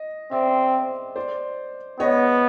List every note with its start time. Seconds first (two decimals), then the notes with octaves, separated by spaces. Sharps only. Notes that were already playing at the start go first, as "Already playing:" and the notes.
Already playing: D#5
0.31 C4 D5 E5
1.16 C5 D5
2.00 B3 C#5 D#5